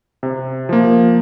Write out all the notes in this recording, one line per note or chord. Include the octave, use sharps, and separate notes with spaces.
C3
F3 A#3